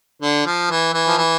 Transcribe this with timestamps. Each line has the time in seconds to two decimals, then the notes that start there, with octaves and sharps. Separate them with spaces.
0.22 D3
0.46 F3
0.71 E3
0.94 E3
1.07 F3
1.17 E3